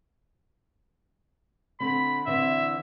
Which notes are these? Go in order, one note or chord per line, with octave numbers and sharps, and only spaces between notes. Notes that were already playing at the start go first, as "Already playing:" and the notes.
D3 C4 B5
D3 E3 C4 E5